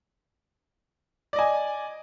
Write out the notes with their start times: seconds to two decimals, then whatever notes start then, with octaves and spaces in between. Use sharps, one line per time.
1.33 D5
1.36 D#5
1.39 G#5